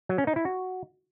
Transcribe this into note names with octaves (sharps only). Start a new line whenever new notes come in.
F#3
C#4
D#4
E4
F#4